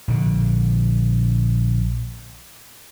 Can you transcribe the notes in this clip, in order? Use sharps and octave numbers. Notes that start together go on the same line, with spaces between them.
A#1 D3